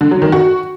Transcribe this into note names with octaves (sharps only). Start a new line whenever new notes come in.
D3
F#3
D#3
F#4